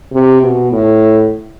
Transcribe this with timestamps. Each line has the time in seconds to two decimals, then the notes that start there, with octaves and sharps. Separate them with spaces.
0.13 C3
0.42 B2
0.72 A2